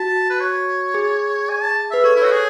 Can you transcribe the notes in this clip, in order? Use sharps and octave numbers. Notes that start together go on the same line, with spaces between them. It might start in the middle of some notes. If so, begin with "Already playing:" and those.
Already playing: F#4 A5
B4
C#5
G#4
G#5
A5
B4 E5
A4 C#5
E4
F#4 C#5
G#4